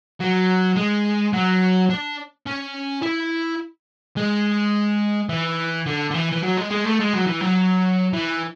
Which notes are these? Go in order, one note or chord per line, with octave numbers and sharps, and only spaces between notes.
F#3
G#3
F#3
D4
C#4
E4
G#3
E3
D3
D3
E3
E3
F#3
G#3
G#3
A3
G#3
F#3
E3
F#3
E3